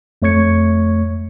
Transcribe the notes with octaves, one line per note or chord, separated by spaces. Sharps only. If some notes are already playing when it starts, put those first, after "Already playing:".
F2 A3 C#5 C#6 G#6 C#7